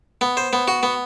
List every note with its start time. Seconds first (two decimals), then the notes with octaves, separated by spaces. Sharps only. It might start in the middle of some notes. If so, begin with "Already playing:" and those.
0.21 B3
0.37 C5
0.53 B3
0.68 F#4
0.83 B3